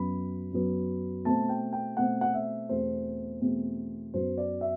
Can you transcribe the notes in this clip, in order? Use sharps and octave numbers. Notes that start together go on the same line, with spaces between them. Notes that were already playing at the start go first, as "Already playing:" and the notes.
Already playing: F#2 F#3 B3 B5
F#2 F#3 B3
B2 A3 C4 A5
G5
G5
B2 A3 C4 F#5
F#5
E5
E2 B2 A3 C4 C5
E2 B2 A3 C4
F#2 F#3 B3 C5
D5
E5